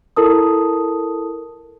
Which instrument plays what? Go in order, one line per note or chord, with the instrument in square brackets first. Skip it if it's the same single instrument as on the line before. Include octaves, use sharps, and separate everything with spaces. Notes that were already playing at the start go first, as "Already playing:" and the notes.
[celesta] E4 A4 A#4 A5 D#6